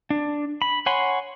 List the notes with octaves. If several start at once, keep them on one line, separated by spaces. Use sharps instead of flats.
D4
B5
C#5 F#5 G#5 B5 C6